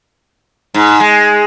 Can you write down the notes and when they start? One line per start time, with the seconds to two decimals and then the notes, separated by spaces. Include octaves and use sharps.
0.74 G#2
1.00 G#3